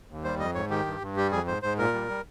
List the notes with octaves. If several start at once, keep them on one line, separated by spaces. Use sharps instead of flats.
D#2
G3 C5
F2 D#5
G#2 C#5
D#3 G4
G2
G2
G3 G4
F2 G#4
G#2 C5
G#2 C5
A#2 A#4
G3
G3